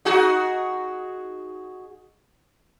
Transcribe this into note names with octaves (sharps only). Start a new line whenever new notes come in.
D#4 F#4 G#4